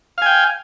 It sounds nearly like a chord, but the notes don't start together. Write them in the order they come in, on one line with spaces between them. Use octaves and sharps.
F5 G#5 G5